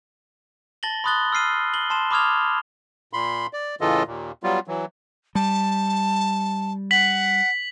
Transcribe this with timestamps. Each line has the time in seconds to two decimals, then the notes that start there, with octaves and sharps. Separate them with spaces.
0.83 A5 A6 A#6 F#7 G7
1.04 B5 C6 D#6 F#6 A6 G7
1.32 E6 F6 C7 D#7
1.74 F#7 G7
1.90 A5 C6 E7
2.11 B5 D6 D#6 F6 G#6 F7
3.13 A#2 B5 C6
3.53 D5
3.81 A2 C#3 E3 F4 A4 D#5
4.07 D#2 A#2
4.43 F#3 G3 B3 F4
4.67 E3 F#3
5.35 G3 A5
6.91 F#5 B6 F#7